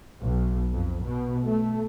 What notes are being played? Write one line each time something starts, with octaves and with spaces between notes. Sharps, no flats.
B1
F2
B2
A3